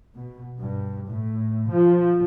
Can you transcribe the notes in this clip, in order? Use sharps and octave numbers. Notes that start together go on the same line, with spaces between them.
B2
G2
A2
F3